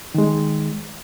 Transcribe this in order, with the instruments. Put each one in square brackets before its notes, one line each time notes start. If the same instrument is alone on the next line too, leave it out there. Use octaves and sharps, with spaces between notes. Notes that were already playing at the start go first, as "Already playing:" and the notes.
[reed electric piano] D#3 G#3